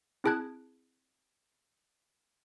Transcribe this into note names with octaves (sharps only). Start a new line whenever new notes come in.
C4 E4 G#4 A5 F#6 G#6